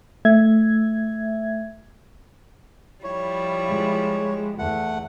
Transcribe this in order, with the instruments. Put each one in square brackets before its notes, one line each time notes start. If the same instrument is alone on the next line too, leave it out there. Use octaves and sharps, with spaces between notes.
[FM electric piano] A3 E5 G#6
[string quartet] F3 G3 E4 [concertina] C#5
[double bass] G#3
[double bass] E2 [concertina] A3 F#5